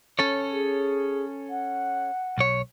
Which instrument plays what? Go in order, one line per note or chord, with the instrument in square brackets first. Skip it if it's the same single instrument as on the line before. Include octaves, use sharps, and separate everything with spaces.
[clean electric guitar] C#4 A4 C#5
[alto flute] G#4
F#5
[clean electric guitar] B1 C#5